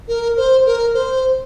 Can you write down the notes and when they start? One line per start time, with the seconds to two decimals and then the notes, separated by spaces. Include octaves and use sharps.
0.08 A#4
0.37 C5
0.65 A#4
0.94 C5